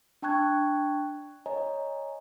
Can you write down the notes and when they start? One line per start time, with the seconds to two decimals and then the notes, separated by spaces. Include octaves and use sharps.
0.22 D4 G5 A5 C#6 F#6 G#6
1.46 C#5 D#5 G#5 A#5